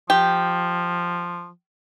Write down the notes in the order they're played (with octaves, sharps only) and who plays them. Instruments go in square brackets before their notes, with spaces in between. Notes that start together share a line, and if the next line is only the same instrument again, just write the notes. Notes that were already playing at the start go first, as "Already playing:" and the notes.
[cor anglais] F3 [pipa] G4